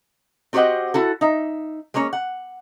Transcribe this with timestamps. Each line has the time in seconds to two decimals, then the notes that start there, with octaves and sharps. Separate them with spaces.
0.53 C4 F#4 G4 C5 D#5 F#5
0.94 E4 F#4 A4
1.21 D#4 E5
1.94 G#3 A#3 C#4 C#5
2.13 F#5